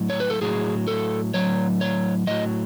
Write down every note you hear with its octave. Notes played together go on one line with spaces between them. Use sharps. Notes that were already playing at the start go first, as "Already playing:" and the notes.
Already playing: A2 F#3
C#5
B4
A4
A2 F#3 G#4
A4
A2 F#3 C#5
C#5
A2 F#3 D#5